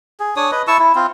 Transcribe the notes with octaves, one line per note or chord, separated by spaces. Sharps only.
G#4
D4 C#5 D#6
B4 D#5
E4 A5 C#6 E6
E4
C4 F4